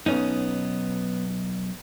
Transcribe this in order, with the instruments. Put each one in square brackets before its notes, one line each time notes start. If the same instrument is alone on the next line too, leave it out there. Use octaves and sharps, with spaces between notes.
[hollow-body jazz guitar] B1 C#4 D#4 [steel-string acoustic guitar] B3